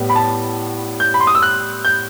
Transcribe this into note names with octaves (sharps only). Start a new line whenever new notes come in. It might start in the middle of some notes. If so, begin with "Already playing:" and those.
Already playing: A2 G3 B3
B5
A5
G6
B5
C6
D#6
E6
F#6
G6